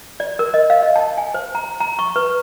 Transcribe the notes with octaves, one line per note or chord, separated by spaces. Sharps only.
D5
A#4
D#5
F5
D#5
A5
G#5
C5
A#5
A#5
C#6
B4